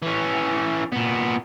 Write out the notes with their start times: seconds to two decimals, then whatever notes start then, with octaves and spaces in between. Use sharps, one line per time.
0.02 E3 C#4
0.92 A#2 B3